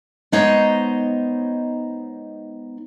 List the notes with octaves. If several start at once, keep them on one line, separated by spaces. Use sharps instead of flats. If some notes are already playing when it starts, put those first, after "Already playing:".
G#3 B3 D#4 C5 C#5 D#5